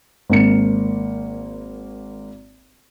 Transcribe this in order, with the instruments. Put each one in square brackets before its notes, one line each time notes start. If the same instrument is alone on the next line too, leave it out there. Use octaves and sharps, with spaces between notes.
[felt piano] G#1 A#3 C#7